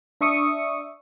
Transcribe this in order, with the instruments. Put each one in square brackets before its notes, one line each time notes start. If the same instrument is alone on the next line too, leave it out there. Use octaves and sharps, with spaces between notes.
[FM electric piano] D4 E5 C#6 D#6 C#7